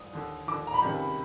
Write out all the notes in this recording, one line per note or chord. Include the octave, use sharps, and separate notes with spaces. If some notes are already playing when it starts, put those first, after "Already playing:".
Already playing: D#6
D#2 D3
D#2 D3 D6
A#5
B5
C#2 C3 D#3